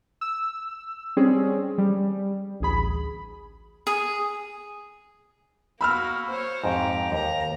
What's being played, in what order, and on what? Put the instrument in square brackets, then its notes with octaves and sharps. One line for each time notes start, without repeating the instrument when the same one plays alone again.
[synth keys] E6
G3 C4 C#4 G#4
G3
A1 D2 G#4 B5
[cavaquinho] G#4
[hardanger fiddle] A#3 F#4 [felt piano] B5 E6 F6
[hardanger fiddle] C5 C#5
[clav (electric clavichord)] F2 G#2 [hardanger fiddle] G4 A#5
[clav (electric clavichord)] D#2 [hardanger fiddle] A#5